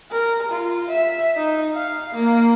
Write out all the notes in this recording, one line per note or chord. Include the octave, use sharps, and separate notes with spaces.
A#4
F4
E5
D#4
F5
A#3